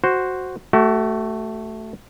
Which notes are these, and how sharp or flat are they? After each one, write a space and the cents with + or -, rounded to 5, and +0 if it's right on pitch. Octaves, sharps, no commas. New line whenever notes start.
F#4 +0 C5 +0
A3 +0 F#4 +35